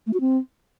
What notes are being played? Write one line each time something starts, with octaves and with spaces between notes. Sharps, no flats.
A3
F#4
C4